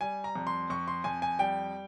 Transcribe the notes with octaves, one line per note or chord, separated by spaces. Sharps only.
G3 G#5
A#5
F2
C6
F2 C#6
C6
F2 G#5
G#5
G3 G5